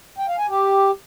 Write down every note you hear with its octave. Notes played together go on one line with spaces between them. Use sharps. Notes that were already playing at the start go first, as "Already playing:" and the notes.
G5
F5
G#5
G4